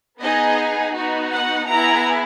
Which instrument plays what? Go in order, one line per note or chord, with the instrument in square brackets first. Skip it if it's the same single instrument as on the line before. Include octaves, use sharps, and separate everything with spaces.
[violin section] B3 D#4 G#4 D#5
B3 D#4 F#4
F#5
B3 E4 G#4 A#5